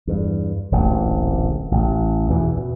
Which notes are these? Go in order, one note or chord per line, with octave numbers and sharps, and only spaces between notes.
E2 G2
D1 A1 A#2
A1
E2 B2 E3
B2